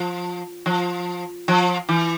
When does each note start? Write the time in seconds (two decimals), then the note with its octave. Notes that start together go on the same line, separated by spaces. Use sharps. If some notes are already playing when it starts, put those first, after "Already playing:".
Already playing: F3
0.66 F3
1.48 F3
1.89 E3